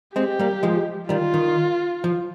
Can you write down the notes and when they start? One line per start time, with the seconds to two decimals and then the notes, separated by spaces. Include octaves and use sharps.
0.16 G#3 C4 G4
0.39 G3 A#3
0.63 F3 G#3
1.09 D#3 G3 F4
1.34 D#3
2.04 F3